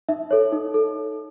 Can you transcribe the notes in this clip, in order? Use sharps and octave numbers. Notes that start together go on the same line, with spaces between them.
D#4 E5
A4 C#5
D#4
A4